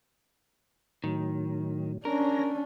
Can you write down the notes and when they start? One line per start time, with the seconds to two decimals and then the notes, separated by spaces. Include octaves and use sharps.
1.04 A2 D#3 F#3
2.05 C#4 D4 A#4 C#5 A#6